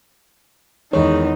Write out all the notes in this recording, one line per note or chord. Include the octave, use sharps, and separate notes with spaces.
E2 D#3 E3 G#3 D#4 C#5